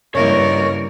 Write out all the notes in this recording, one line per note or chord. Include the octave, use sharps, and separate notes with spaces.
G2 C#3 A#3 E4 A#4 C#5 D#5 C#6